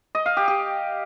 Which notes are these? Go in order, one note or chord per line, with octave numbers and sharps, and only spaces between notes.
D#5
F5
G4
G4